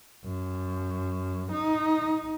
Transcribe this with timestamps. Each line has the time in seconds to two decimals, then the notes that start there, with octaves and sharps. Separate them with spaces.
0.25 F#2
1.52 D#4